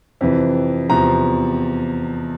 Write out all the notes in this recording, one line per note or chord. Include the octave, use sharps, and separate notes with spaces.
F2 C3 E3
E2 C3 F3 A#5